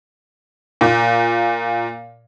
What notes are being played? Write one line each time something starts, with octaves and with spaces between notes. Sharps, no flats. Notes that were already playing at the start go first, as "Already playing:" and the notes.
A#2